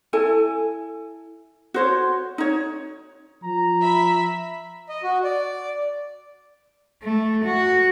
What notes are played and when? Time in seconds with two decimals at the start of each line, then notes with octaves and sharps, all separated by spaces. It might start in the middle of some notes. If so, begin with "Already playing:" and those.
0.13 E4 A4 G#5
1.74 F#4 C5 C#5
2.38 D#4 C#5
3.44 F3 A#5
3.81 E5 B5
4.89 D#5
5.03 F#4
5.24 D5
7.02 A3
7.45 F#4